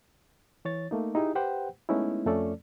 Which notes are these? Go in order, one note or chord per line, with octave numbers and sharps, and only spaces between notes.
E3 C#5 A6
A3 A#3 D#4
D#4 E4 G4 G#4
G4 B4 C5 F#5 G5
G#3 A3 B3 C#4 D#4 E4
F2 F3 A3 C#4 A4 D5